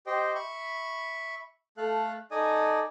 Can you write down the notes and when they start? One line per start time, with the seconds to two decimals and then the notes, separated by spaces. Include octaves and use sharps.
0.06 G4 C5 D#5 G5
0.35 E5 B5 C#6
1.77 A3 A4 F5 F#6
2.31 D#4 A4 D5 D#5 G#5 D#6